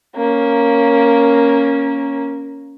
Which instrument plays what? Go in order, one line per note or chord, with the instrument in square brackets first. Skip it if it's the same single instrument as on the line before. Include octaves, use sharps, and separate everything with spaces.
[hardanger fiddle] A#3 C#4